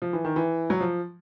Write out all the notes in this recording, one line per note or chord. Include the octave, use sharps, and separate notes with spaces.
F3
E3
D#3
E3
F#3
F3